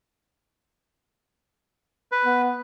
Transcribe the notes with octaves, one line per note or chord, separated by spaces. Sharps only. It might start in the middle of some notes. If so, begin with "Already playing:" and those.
B4
B3